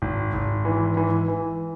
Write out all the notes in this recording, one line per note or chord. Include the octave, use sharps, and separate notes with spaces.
G#1
G#1
E3
E3
E3